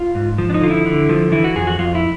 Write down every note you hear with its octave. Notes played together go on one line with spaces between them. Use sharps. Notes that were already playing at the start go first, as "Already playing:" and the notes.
Already playing: F4
G#2
F3
D4
D#4
D3 F4
E4
D3
F3
E3 E4
F#4
F2 G#4
F#4
F2 F4
E4